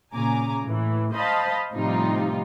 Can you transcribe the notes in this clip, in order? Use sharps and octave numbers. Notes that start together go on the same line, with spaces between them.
A#2 C#3 G#5 A#5 D6
A2 E3
C5 D#5 F5 A5 B5
A2 C3 F3 G3 D#4 F4